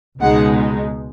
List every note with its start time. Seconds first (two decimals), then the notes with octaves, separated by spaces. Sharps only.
0.20 C#2 B2 G#3 D#4 F#5